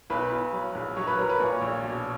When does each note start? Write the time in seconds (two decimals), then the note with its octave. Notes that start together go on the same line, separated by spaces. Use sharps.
0.10 B1 B4 B5
0.32 B1
0.53 F#3
0.75 A#1
0.96 F#3 C#5 C#6
1.07 B4 B5
1.18 F#3 A#4 A#5
1.29 B4 B5
1.40 A#2 C#5 C#6
1.61 A#1
1.84 B2